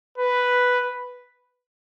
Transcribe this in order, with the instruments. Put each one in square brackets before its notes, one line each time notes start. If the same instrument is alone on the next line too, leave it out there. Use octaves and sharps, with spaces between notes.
[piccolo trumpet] B4